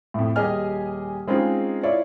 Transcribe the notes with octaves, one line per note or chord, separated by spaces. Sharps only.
F2 A2
D#1 G4 G#4 D#5 G#5 F6
G#3 C4 C#4 D#4 F4 G#4
E4 F4 C#5 D5